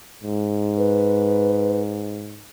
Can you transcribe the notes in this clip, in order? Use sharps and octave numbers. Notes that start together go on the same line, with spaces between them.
G#2
B4